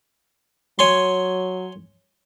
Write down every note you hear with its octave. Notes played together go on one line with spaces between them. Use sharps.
F#3 C#5 G#5 C6